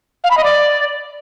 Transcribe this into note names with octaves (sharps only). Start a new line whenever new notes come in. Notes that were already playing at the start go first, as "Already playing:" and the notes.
F5
B5
D#5
D5